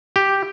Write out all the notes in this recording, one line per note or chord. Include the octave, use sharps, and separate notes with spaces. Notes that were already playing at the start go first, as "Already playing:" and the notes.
G4